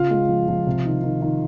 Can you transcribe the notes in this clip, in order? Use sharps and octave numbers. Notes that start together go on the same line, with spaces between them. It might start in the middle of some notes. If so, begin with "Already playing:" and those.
Already playing: C#3 F4 F5
G#3
F3
F3
C3
D#3
D#3
D#3